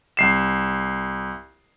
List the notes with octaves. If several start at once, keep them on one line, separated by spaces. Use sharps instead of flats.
C2 C7 E7